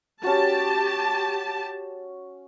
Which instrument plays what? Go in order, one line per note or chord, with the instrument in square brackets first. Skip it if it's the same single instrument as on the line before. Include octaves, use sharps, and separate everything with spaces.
[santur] C#4 F#4 [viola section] G4 A5